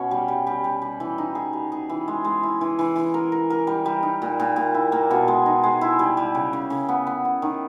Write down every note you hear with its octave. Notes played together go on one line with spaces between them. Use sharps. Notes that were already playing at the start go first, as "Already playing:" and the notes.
Already playing: B2 C#4
G3
G3
G3
G3
G3
E3
D#4
G#4
G3
G#4
E3
G#3
G#3
E4
E3
E3
E3
A#4
A#4
A#4
G3
G3
D#4
A#2
A#2
A#2
E4
A#3
B2
G#3
D#4
G#3
E4
G3
G3
C#3
C#3
C#3
B3
B3
B3
D#3